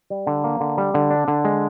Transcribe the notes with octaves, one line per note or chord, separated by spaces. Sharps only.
G3
D3
A#3
D3
G3
D3
D4
D3
G#3